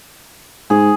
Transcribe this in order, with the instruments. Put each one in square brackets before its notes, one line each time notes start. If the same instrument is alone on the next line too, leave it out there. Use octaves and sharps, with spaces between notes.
[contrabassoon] G#2 [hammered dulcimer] G#4